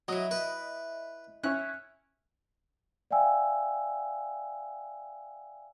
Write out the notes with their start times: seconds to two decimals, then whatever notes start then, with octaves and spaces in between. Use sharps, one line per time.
0.08 F#3 E4 D#5
0.31 B4
1.44 C#4 E4 C#5 F#6
3.11 D5 E5 F5 G5 G#5 E6